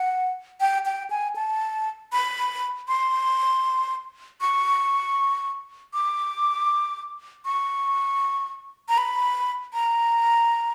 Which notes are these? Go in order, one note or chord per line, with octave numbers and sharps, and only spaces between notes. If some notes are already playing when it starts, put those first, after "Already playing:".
Already playing: F#5
G5
G5
G#5
A5
B5
C6
C#6
D6
C#6
A#5
B5
A#5